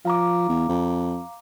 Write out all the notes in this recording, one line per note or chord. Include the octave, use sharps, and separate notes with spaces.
F3 F5 A#5 D6
E2
F2